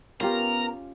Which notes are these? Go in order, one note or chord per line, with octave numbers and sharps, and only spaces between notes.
B3 C#4 F4 G4 A#4 A#5